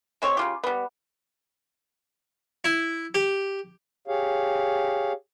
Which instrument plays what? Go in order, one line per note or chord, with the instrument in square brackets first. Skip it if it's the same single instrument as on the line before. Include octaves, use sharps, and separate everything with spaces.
[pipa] G#3 C4 C#5
C#3 F4 G4
G3 B3
[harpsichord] E4
G4
[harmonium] G4 G#4 C#5 F5